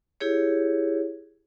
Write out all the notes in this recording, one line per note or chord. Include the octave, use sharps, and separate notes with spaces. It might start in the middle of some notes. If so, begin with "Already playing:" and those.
E4 G4 G#4 C#5